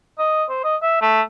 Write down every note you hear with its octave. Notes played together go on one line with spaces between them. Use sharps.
D#5
C5
D#5
E5
A3